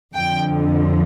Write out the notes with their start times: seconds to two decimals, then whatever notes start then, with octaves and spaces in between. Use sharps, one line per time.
0.15 F2 D3 F3 G5